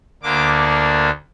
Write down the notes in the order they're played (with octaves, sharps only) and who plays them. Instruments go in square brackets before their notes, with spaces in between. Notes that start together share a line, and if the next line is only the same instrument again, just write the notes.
[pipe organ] D2 D3 A#3 D4 D6